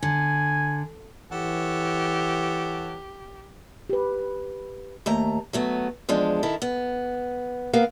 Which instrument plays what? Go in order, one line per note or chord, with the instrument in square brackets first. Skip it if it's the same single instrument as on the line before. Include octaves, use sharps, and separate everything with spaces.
[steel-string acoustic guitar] D3 [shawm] G#5
[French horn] E3 [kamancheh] G4 [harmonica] A4 C#5 F#5
[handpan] G4 B4
[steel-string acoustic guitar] D#2 A3 A#5
F#3 A3 B3
E2 F3 G#3 D4
D#3 E4 A4
B3
A#3 B3 A#4 F5